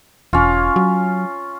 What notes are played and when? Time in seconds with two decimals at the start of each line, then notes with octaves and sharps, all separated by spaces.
0.33 E1 C#4 F4
0.76 F#3